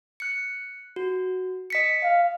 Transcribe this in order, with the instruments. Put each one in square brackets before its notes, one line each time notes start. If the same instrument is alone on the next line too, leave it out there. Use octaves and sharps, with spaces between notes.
[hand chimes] F#6 C#7
F#4
D#5 B6 C#7
[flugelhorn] F5